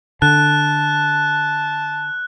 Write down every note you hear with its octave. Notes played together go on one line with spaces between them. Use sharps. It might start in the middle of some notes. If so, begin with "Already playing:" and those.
D3 A5 F#6